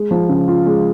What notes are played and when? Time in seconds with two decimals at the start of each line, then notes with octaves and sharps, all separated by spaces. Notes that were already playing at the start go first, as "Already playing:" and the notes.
Already playing: G#3
0.11 F3
0.29 C#3
0.48 F4
0.66 G#3